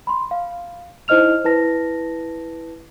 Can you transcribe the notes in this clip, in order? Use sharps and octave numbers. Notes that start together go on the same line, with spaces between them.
B5 C6
F5
D#4 E4 C5 D#5 F6 F7
E4 B4 A5 A#6